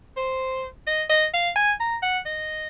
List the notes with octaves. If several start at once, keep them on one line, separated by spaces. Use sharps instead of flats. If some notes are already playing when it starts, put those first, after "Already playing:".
C5
D#5
D#5
F5
G#5
A#5
F#5
D#5